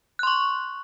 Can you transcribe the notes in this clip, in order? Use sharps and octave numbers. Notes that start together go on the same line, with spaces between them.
C6 C#6 F#6